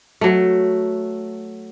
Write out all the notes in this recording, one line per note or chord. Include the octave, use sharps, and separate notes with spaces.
F#3 A3